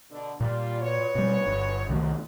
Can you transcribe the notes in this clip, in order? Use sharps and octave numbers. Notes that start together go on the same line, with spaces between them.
B2 D3
A#2 G3 F4
B3 F#4 C#5
B2 G3
G1
C2 D#3 F#3 A3